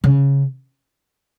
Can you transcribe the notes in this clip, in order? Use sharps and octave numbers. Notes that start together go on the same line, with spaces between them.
C#3